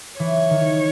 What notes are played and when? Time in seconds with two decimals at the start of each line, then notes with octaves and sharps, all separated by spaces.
0.19 E3 C#5
0.50 D#3